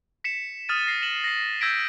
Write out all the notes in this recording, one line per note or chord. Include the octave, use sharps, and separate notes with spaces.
B6 C#7 E7
D#6 F6 A6 D#7
A#6 C7
E7 F#7
A#6 C7
E6 G6 G#6 A#6 B6 D7